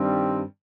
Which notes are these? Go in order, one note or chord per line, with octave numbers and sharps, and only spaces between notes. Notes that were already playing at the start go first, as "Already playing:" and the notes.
Already playing: G2 D#3 G3 C4